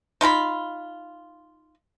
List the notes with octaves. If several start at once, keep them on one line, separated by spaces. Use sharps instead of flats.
D#4 F4 A#5 B5